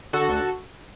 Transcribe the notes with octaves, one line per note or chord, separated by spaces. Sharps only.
D3 F#4 A4
D2